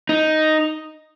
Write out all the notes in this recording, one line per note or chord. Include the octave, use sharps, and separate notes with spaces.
D#4